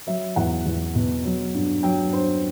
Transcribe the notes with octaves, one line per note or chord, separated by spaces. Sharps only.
F#3 E5
E2 F#5
E2
B2
F#3
G2
F#3 G5
G2 C5